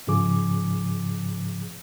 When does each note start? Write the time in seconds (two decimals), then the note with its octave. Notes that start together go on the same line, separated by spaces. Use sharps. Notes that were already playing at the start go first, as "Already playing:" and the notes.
0.07 G#2 C#3 F3 G#4 D6